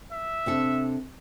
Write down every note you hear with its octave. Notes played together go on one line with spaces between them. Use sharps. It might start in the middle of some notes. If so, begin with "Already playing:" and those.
E5
C3 D4 A4